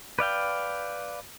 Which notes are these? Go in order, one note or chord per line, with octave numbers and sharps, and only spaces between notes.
B4 D5 F5 G5